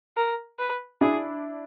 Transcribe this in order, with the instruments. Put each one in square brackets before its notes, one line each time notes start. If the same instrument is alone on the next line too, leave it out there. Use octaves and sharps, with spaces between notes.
[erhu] A#4
B4
[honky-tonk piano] D4 E4 [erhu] G#4